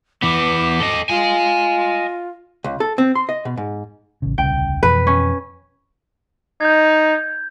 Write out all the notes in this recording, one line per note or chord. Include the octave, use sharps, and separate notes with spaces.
E3 B3 D6
A4 D#5
F4 D#5 G#5
C#2
A4
C4
C6
D#5
B2
G#2
A1 C#3
D#1 C2 C#3 G5
F2 B2 E3 B4
C#4
D#4 G6 G#6